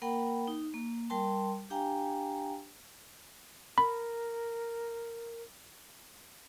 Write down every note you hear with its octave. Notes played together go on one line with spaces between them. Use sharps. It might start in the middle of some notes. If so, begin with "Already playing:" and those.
A#3 A#4 F#5 G5 B5
D#4
A#3
G3 A#4 G5 A5 C6
D4 G4 F5 G5 G#5 A#5
A#4 B5